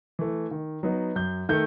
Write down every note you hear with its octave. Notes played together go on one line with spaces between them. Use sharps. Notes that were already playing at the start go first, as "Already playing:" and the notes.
E3 A3
D#3
F#3 B3 D#4
F#2 G6
D#3 A3 G6